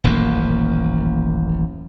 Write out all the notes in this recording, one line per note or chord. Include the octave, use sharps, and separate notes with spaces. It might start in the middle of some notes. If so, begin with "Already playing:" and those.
D#1 A1 F#2 A#3